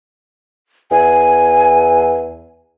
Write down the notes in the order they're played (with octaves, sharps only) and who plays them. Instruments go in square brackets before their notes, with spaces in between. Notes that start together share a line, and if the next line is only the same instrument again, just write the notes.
[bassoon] E2 [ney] G#5